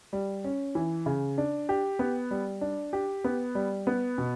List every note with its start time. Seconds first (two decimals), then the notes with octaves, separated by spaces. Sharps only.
0.13 G3
0.44 C#4
0.75 E3
1.06 C#3
1.38 D4
1.69 G4
1.99 B3
2.31 G3
2.61 D4
2.93 G4
3.24 B3
3.55 G3
3.87 B3
4.18 B2